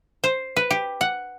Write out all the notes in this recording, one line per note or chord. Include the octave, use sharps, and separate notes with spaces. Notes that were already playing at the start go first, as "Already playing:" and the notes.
C5
B4
G4
F#5